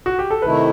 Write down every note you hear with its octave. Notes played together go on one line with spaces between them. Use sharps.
F#4
G4
A4
C3 D#3 A3 E4 B4